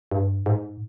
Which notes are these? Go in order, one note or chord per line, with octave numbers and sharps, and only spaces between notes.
G2
G#2